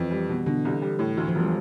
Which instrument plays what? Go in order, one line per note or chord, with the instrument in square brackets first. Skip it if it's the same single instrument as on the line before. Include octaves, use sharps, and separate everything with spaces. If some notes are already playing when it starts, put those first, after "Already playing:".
Already playing: [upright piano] F2 [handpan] E3
[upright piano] G3
B2
[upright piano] B2 [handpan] D3
[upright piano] C2
G3
A2
[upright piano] D2 [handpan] E3
[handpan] F3
[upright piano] E1 [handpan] G3